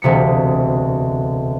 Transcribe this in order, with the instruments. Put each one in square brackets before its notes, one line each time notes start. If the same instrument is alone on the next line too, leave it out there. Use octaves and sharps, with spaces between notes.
[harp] E1 D2 C3 B6 C#7